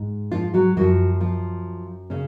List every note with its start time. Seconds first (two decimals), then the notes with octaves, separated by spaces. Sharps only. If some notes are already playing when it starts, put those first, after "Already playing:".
Already playing: G#2
0.32 F3 F4
0.54 F#3 F#4
0.77 F#2 F#3 F#4
0.81 F3
1.20 F3 F4
2.10 C#3 C#4